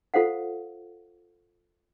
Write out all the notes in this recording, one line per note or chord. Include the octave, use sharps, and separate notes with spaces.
F4 A4 C5 F5 F#5